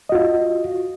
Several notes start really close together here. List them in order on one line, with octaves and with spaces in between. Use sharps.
D#5 F#4 F4